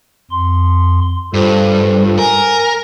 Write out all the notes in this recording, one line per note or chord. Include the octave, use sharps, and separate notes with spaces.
F2 C6
G2 F4 A4 C5
A#4 G#5